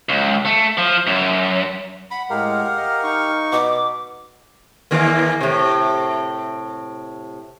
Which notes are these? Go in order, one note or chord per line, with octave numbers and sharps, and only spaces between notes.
C#2
A3
F3
F#2
F#5 B5
A2 G#3 G4 A#4 F5
D#5
D#4 C#6
B2 D6
D#2 E3 A#3
A2 C3